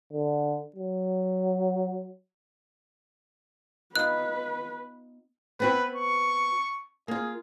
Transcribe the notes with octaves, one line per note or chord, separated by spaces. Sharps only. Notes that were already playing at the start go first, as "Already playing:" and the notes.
D3
F#3
B3 D#4 F4 B4 F#6
B3 C4 F#4 B4
C#6
A#3 F4 G#4